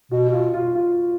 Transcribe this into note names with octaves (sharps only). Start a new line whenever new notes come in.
B2 F#4
F#4
F4
F4
F4